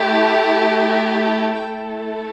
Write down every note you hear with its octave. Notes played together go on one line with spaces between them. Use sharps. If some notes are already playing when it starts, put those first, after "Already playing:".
Already playing: A3 E4 G4
F#5
E5
G5
A3 E4 A4 G5